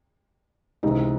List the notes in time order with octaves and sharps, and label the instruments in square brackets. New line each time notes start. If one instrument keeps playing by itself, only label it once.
[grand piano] C#2 C3 E3 [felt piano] D#4